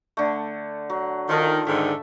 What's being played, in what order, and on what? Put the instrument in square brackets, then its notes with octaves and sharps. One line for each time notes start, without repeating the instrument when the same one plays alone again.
[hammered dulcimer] D3 A3
F#3
[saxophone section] D#3 [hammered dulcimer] F3 F4 A4
[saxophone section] G#2 D3 D#3 [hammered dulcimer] E5